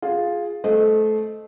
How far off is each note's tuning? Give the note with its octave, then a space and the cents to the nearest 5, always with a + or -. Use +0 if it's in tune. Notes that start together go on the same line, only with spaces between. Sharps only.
F4 +0 G#4 +0
A3 -20 C5 -15 D#5 +0